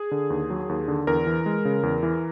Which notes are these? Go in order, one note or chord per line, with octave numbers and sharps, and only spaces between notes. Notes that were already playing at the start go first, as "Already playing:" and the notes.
Already playing: G#4
D3
D#2
F#3
D#2
D3
E2 A#4
E3
G#3
C#3
E2
E3